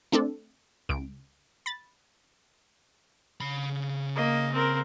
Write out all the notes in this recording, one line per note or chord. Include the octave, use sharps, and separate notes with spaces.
A3 C4 D4 A4
C#2 D7
B5 A6
C#3 B5
A#3 D#5
C4 A#4